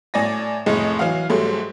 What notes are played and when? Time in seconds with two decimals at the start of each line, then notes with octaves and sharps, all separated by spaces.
0.14 A2 D5 G#5 A#6
0.66 F1 A2 G#3 D#5
0.99 E3 F#3 F5
1.30 G#2 F#3 G3 A3